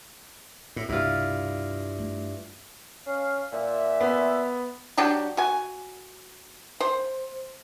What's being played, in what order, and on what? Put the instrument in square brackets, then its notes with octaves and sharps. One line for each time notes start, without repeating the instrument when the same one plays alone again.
[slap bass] A2
[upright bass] C2 B2 [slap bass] G2 [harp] E4 F4
[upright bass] A3
[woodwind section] C#4 F5
A#2 E5
[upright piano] B3
[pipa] F#3 D4 F#4 G4
F#4 G#5
C5